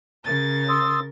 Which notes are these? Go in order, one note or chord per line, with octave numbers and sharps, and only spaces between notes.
C#3 A#4 A6
C6 D#6 E6